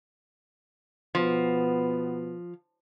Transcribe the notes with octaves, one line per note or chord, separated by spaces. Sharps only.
B2 F3 B3